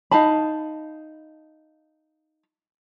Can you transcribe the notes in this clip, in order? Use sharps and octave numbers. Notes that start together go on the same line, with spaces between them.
D#4 F5 A5 B5